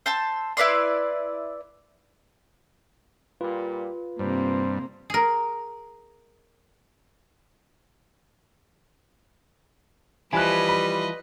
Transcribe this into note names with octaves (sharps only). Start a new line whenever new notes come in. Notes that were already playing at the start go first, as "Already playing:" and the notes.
C5 A5 E6
E4 B4 D5 C6
A#2 G3 F4 B4
G2 C3 A#3 C5
G#4 A#4
E3 F3 G3 B4 D#5 G#5 F#6
B5